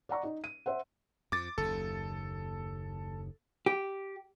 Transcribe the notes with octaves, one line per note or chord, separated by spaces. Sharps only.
D5 F#5 A#5 C#6
D#4
D#7
C5 E5 F#5
F2 D6 A6
F#1 D#2 A4
G4